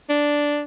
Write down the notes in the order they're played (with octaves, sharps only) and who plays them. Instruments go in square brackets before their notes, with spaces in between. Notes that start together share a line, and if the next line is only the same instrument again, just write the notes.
[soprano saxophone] D4